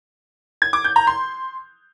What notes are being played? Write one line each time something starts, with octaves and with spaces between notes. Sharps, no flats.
G#6
D6
G6
A#5
C6